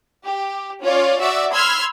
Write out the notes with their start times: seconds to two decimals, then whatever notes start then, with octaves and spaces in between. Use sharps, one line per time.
0.24 G4
0.82 C#4 F4 C#5 D5
1.20 F#4 D5 E5 E6
1.53 B5 C6 E6 F6 G#6